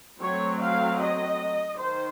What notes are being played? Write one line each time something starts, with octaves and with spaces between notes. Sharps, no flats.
F#3 A3 C4 C#5
F5
D#5
D#3 C5